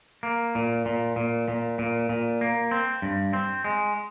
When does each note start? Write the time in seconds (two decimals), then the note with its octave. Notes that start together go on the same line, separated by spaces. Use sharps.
0.23 A#3
0.55 A#2
0.86 A#2
1.16 A#2
1.48 A#2
1.79 A#2
2.09 A#2
2.41 A#3
2.71 C4
3.02 G2
3.33 C4
3.64 G#3